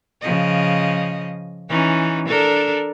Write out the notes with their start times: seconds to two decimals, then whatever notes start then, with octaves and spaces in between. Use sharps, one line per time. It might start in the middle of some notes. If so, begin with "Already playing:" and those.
0.22 C#3 F3 D#5
1.69 E3 C#4 D#4
2.27 D4 A4 A#4